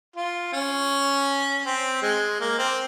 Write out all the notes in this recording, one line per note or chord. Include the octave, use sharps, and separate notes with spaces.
F4
C#4
C4
G#3
A#3
C4